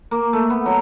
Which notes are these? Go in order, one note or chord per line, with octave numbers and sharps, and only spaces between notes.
A#3
A3
B3
F#3